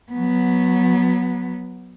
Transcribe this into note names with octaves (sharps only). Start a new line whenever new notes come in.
F#3 B3